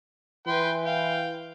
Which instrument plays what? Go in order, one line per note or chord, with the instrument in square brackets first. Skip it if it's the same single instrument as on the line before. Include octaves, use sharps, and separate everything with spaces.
[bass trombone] E3 [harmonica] B4 G5 C6
[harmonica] F5 G5